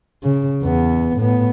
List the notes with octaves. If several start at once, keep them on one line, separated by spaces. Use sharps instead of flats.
C#3
E2 B3
A2 B3